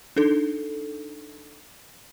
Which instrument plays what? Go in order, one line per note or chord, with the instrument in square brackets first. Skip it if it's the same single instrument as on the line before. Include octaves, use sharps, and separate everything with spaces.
[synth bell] D4 D#4 A4